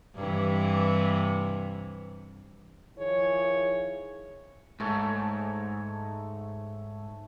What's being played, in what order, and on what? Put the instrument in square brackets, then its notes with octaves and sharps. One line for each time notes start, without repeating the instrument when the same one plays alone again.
[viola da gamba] G2 C3 E3
[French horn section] D#3 F3 E4 G#4 C#5
[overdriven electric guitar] G#2 [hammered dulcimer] A3 A4 C#5